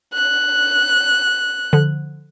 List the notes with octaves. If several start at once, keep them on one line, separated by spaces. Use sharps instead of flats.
F#6
D3 F3